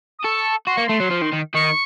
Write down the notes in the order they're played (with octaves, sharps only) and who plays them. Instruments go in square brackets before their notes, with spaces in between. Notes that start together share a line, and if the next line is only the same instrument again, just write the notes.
[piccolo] D#6
[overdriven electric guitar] A4 [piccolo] C#6
[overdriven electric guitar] F#4 [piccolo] C6
[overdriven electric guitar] A#3 [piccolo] C#6
[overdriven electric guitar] A3 [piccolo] C6
[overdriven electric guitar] F#3
F3
D#3
D#3
[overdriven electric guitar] D#3 [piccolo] C#6